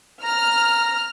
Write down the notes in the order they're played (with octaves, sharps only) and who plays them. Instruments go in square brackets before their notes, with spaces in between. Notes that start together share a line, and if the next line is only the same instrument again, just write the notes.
[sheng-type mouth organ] A#5 [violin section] F6